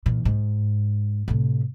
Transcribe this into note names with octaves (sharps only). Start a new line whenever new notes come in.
A#2 E3
G#2
A2 C3